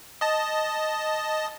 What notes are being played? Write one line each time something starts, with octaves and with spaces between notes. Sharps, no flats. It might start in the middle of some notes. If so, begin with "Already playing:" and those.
D#5 A5